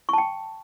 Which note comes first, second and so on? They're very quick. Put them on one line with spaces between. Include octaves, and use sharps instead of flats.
C#6 A5 G5